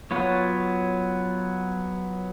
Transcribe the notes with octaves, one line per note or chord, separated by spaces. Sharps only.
F#3 B3 F4 C#5